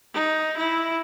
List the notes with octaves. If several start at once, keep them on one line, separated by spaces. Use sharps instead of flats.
D#4
E4